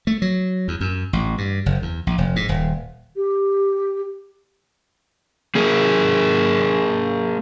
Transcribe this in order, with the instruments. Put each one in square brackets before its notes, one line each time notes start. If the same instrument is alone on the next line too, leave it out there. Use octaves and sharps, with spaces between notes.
[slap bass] A3
F#3
E2
F#2
A1
G2
F#1
E2
A#1
F1
G#2
D#1
[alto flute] G4
[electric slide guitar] A#3 G#4 A#4